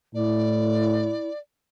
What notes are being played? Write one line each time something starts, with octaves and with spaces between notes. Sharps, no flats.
A2 E4 D5